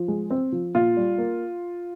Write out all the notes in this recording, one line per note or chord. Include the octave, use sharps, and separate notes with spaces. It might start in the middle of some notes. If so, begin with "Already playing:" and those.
Already playing: F3
G#3
C4
F3
A#2 F4
G3
A#3